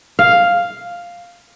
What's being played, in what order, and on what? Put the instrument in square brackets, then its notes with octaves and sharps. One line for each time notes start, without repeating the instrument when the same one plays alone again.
[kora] F5